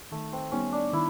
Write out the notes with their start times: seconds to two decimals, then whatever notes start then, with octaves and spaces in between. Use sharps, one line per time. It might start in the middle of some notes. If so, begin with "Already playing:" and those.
0.12 D#3 A3
0.32 C4
0.52 G3 B3 C#4 D#4 G4
0.72 D4
0.93 D#3 E4